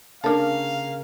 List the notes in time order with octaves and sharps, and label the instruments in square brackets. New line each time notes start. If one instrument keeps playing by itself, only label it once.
[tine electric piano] C#3 A#4 [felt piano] A#3 [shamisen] D4 A4 [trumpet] F5